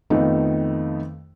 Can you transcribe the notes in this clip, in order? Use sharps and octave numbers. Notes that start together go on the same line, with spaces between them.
F2 D#3 F3 A3 B3 D#4